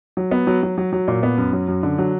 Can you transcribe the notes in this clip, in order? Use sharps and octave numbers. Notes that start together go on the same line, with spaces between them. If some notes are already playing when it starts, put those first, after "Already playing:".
F#3
B3
F#3
F#3
F#3
F#3
A#2
B3
F#2
F#3
F#2
D3
F#3